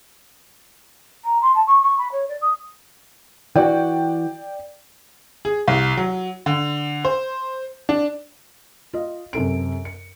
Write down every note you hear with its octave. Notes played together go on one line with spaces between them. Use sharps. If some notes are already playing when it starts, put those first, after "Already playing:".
A#5
C6
A5
C#6
C#6
B5
C#5
D5
D#6
E3 F#4 D5 G5
G#4
C2
F#3
D3
C5
D4
F4 D#5
F#2 C3 A4 D7
C#7